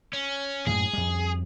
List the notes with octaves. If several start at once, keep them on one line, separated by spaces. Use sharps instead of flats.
C#4
F#2 A2 G#4
F2 G3